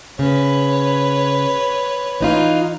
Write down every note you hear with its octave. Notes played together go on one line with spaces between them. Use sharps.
C#3 B4 C#5
E3 D#4 F4